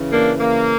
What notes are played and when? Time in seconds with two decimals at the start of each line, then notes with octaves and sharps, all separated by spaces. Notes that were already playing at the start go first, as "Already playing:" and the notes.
Already playing: C#3 E3
0.10 A#3 D4
0.40 A#3